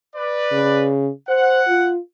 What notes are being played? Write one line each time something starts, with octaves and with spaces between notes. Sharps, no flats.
B4 D5
C#3
C5 F#5
F4